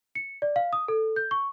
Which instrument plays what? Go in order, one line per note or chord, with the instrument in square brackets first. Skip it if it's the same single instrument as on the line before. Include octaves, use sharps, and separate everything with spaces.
[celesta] C#7
D5
F5
D#6
A4
G6
C#6